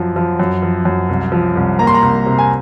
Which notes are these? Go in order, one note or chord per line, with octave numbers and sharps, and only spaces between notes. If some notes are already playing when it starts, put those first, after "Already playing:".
Already playing: F#2 F3
F3
F#2
F3
F#2
C2
F3
C2
A#3 A#5
C6
A#5
C2
C3
G#5